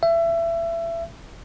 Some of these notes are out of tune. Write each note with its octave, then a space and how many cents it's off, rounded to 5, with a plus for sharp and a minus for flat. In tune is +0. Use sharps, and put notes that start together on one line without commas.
E5 +25